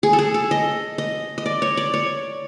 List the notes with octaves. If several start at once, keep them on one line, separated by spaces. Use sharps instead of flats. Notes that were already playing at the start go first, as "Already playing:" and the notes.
G#4
A4
G#4
A4
D#5
D#5
D#5
D5
C#5
D5
C#5